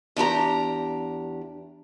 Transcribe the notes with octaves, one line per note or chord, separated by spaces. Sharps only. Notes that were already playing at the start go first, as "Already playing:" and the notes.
E2 D4 G4 A#5